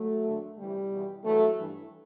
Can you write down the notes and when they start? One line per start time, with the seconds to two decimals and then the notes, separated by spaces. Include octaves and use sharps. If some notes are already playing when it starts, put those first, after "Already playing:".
Already playing: F#3 A3
0.25 F#2 D3
0.57 D2 C3 E3 G3
0.91 E2 B2
1.23 G2 E3 F#3 A3
1.57 G2 E3